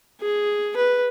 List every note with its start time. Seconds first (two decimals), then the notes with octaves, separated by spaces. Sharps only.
0.21 G#4
0.76 B4